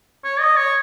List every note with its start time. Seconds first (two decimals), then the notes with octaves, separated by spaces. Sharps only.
0.24 C#5
0.40 D#5
0.56 C#5